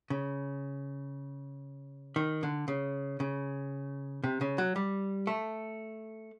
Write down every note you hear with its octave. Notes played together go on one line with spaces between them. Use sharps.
C#3
D#3
D3
C#3
C#3
C3
C#3
F#3
G3
A3